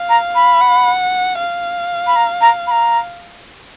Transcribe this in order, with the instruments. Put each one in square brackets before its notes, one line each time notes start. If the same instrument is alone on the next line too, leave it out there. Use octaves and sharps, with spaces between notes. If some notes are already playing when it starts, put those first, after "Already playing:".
Already playing: [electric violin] F5
[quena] A#5
B5
[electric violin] F#5
F5
[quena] B5
A#5
A#5
B5
A#5